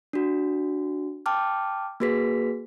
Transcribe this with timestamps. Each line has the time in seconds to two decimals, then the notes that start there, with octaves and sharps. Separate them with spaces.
0.13 D4 F#4
1.26 G5 A5 D6 F6
2.00 A#3 F#4 G#4 B4 B6